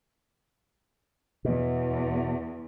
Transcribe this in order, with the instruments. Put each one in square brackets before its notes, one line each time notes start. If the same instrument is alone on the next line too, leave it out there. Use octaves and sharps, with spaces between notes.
[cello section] E2 [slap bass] B2